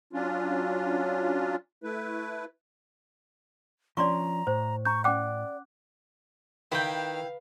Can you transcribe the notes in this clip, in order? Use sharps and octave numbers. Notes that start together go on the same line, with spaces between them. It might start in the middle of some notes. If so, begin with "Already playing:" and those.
F#3 C#4 D4 F4
A3 E4 B4
F3 C#4 D4 D5 A#5 C6 C#6
A2 C5
A#5 C#6 G6
C#4 D5 F#5 G5 D6 F#6
D#3 E4 B4 F5 G5